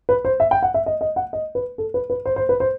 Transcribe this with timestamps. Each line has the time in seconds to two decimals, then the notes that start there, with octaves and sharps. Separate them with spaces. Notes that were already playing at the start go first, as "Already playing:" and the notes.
0.09 B4
0.25 C5
0.40 E5
0.51 G5
0.63 F#5
0.74 E5
0.86 D#5
1.01 D#5
1.16 F#5
1.33 D#5
1.55 B4
1.78 A4
1.94 B4
2.10 B4
2.26 C5
2.36 C5
2.49 B4
2.60 C5